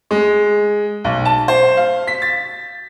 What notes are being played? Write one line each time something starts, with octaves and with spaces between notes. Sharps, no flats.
G#3
B1
A5
C5
F5
B6
A6